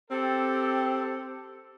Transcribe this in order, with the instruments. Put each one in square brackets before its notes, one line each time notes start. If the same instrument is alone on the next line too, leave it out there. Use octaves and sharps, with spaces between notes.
[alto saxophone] C4 [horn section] G4 A4